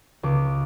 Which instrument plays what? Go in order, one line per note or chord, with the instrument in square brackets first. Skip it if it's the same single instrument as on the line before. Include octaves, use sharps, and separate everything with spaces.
[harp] C#2 D6